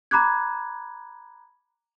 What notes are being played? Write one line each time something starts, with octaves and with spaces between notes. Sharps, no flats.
A#5 B5 D6 F#6 G#6